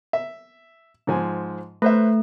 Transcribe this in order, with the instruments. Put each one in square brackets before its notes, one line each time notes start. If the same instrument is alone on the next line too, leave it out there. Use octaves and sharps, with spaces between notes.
[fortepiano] E5
G#2 F3 G#5
[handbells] A3 [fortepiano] B4 C5 E5